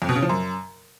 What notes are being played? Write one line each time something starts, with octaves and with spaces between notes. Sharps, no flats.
F2
B2
C#3
F3
F#2